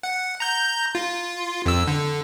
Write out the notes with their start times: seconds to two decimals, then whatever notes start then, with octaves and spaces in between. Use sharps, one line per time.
0.03 F#5
0.40 A#5 G6
0.95 F4
1.66 F2 E6
1.87 D3